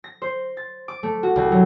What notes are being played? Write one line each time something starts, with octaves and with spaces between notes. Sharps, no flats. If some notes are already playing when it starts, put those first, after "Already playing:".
A#6
C5
A6
D6
A3
F#4
C2
F#3